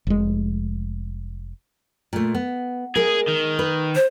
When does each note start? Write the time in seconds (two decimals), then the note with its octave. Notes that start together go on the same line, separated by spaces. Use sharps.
0.07 F1 G#3
2.13 A#2 A3
2.35 B3
2.96 G#3 G#4 A#4
3.28 D#3
3.59 B4
3.95 C5